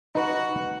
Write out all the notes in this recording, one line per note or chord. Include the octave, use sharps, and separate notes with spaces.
D#4 F#4 B4 F#5